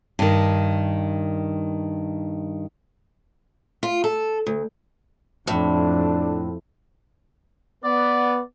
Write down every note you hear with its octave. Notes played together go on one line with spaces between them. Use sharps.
G2 D#3
F4
A4
D2
F2 A2 D4
B3 D5